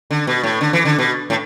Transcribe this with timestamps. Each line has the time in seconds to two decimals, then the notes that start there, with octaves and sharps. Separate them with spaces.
0.11 D3
0.27 B2
0.43 A2
0.61 D3
0.73 E3
0.85 D3
0.99 B2
1.30 A2